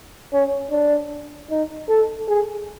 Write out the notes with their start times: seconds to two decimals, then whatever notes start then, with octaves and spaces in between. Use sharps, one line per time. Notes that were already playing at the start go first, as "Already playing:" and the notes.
0.33 C#4
0.71 D4
1.50 D#4
1.89 A4
2.28 G#4